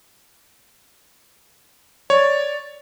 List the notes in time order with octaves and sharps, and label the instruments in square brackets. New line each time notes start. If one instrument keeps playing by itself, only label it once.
[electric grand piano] C#5 [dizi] D5